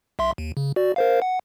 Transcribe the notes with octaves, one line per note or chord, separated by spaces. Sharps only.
B1 E5 C6
D#2
C#3
F#4 D5
A#4 C5 F5
F#5